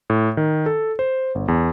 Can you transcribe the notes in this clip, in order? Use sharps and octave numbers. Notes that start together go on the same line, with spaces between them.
A2
D#3
A4
C5
G1
E2